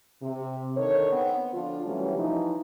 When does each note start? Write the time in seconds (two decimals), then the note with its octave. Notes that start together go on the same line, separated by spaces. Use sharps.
0.22 C3
0.77 D3 D#3 A4 C#5
1.12 B3 C4
1.54 D3 F3 D4 F4
1.86 C3 E3 F#3 G3 A3 C#4
2.18 E3 F3 D#4